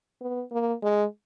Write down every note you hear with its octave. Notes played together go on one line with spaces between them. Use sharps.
B3
A#3
G#3